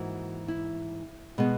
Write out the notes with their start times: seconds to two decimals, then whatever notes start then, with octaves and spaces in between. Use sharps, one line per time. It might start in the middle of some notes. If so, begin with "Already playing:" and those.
Already playing: G#2 E3 A#3 F#4
0.48 E4
1.38 B2 G#3 B3